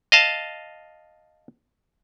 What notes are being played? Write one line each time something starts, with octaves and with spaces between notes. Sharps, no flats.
D#5 F5 A5